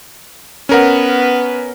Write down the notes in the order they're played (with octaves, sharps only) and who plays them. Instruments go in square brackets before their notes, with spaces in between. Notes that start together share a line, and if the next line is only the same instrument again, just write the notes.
[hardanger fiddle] B3 B4 [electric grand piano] C#4 A#4 F#5